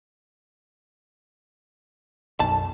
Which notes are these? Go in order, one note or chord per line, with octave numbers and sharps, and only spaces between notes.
B1 F#2 A5